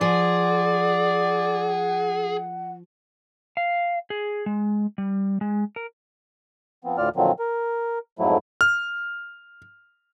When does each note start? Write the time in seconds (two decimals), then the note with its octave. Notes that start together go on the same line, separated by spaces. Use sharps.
0.01 F3 G#4 D5 F#5
3.57 F5
4.10 G#4
4.46 G#3
4.98 G3
5.41 G#3
5.76 A#4
6.84 F3 B3 C4
6.98 D2 A2 F4 D5 F6
7.16 A#2 D3 D#3 F3 F#3 C4
7.39 A#4
8.19 F2 G#2 F3 F#3 A3 E4
8.61 F6